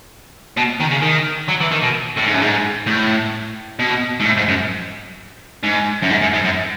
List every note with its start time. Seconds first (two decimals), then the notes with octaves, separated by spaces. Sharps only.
0.57 B2
0.80 D#3
0.91 C#3
1.02 D#3
1.48 F#3
1.61 E3
1.72 D#3
1.83 B2
2.17 A2
2.25 G#2
2.34 F#2
2.42 G#2
2.87 A2
3.79 B2
4.20 G#2
4.25 A2
4.37 G#2
4.48 F#2
5.64 G#2
6.02 F#2
6.10 G#2
6.22 F#2
6.34 G#2
6.44 F#2